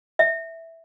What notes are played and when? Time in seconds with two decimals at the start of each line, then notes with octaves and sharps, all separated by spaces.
0.19 E5